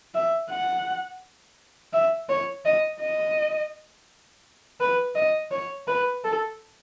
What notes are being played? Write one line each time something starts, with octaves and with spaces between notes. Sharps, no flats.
E5
F#5
E5
C#5
D#5
D#5
B4
D#5
C#5
B4
A4